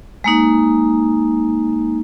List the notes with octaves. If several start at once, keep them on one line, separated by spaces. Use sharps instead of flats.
G#3 A#3 D#4